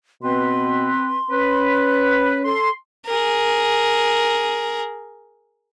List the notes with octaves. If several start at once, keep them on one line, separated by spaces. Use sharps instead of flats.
B2 C4 B4 C6
C#4 B4
A4 C6
G#4 A#4